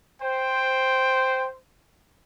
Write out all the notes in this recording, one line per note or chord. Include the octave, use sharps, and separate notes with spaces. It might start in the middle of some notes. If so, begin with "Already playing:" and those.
C5 G5